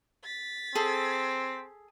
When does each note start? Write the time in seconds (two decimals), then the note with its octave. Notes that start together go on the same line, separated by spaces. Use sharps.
0.24 A6 B6
0.75 C4 G#4 A4